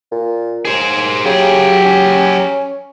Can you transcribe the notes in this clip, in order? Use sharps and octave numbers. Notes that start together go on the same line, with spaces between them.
A#2
D#2 G#4 C5
C#3 F#3 G4 G#4
C#4